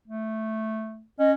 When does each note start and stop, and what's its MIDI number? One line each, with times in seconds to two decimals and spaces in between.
0.08 1.04 57
1.19 1.35 61
1.19 1.31 75